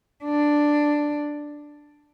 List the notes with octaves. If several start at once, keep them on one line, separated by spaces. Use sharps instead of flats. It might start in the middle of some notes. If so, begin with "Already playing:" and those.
D4